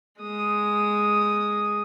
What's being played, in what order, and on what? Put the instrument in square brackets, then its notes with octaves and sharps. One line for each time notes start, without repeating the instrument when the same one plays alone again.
[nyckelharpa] G#3 D#6